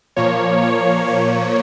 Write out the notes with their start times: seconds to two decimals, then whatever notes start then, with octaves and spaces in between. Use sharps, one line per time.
0.16 A#2 F3 A#3 C#5
0.62 C#5
1.07 C#5